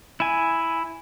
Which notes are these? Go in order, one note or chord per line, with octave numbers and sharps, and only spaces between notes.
E4 G#5